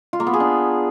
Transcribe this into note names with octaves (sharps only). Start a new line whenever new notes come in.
F4
A#3
B3
G#4
D4